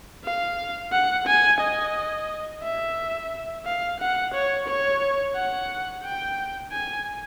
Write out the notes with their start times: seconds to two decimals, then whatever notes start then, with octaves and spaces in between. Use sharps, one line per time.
0.24 F5
0.92 F#5
1.27 G#5
1.61 D#5
2.63 E5
3.66 F5
4.00 F#5
4.34 C#5
4.68 C#5
5.36 F#5
6.04 G5
6.72 G#5